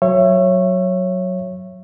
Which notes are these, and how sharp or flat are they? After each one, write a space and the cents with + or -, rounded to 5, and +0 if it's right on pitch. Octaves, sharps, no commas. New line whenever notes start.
F#3 +0 C#5 -15 E5 +25